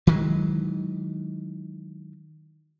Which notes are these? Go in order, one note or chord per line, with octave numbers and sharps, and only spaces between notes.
D#3 E3 F#3 G#3